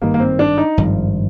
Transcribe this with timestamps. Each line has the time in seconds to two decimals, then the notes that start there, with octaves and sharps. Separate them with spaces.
0.01 G#1 G2 D#3 A#3
0.14 A#3
0.20 C4
0.39 D4
0.58 D#4
0.77 G#1 G2 F3